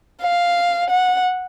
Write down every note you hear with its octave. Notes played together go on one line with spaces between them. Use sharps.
F5
F#5